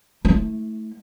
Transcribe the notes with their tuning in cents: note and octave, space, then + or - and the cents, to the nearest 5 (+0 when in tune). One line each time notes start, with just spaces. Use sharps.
A3 +0 E4 -25